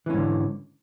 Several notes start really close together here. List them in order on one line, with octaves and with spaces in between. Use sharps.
E3 C#4 G#2 D3